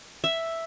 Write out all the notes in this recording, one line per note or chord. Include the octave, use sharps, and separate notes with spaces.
E5